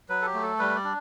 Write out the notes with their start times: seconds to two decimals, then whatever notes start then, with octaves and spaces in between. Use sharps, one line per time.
0.09 F#3 B4
0.21 A4
0.26 G4
0.34 A3
0.43 A4
0.59 G3 B4
0.76 D5
0.84 D4